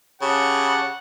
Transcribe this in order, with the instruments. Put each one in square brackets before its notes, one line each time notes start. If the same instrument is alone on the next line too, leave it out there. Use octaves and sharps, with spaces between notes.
[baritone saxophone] C#3 [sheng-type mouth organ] G4 C#5 A5 [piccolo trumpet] F#5